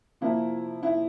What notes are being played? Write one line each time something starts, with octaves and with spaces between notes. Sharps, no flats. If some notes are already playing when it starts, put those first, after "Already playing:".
C3 F3 A#3 E4
E4